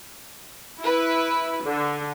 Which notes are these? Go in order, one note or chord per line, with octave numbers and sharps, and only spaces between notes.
E4 B4
D3